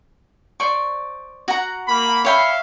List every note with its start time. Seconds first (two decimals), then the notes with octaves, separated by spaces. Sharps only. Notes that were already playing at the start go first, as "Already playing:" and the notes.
0.60 C5 D5 C#6
1.48 F#4 F#5 A#5
1.88 A#3 B5
2.25 C#5 E5 F5 G5 B5